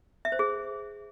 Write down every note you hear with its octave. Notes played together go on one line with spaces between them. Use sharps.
E5
C5
G#4